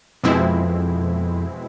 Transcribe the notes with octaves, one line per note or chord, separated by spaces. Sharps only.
F2 B2 G#3 C4 E4